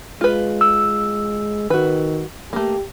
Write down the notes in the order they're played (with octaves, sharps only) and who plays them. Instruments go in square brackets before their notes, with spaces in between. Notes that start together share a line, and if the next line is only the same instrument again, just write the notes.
[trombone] G#3 [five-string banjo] F4 B4
[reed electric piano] E6
[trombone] D#3 [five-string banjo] F#4 B4
[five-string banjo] A3 A#3 [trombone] G4